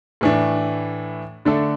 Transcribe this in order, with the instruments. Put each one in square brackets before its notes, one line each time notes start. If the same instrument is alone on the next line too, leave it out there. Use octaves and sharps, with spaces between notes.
[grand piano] A2 E3 A3 D4
D3 A3 D4 A4